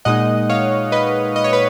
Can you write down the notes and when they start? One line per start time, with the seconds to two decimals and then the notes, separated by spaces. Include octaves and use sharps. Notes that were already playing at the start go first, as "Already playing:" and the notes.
0.05 A#2 G#3 D#4 D#5 F#5
0.49 C#5 F5
0.92 B4 D#5
1.36 D#5
1.44 C#5
1.53 B4